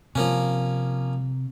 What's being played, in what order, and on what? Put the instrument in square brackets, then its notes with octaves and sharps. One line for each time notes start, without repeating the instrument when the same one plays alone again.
[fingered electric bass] C3 [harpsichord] F3 A#3 C#4